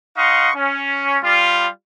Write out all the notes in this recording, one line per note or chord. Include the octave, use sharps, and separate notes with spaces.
D#4 D#5 F5 F#5 C6 C#6
C#4
G3 F4